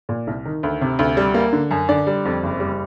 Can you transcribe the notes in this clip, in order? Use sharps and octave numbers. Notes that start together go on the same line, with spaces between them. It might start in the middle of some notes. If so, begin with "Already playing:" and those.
A#2
C2
D#3
D2
C3
D2
G3
A#3
D3
F#2
D3 D5
G3
F2
F#1
G3